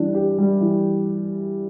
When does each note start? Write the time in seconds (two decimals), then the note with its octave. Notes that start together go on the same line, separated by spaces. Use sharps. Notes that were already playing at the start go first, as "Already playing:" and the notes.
Already playing: E3 G3 D4
0.15 G4
0.38 G3
0.61 E3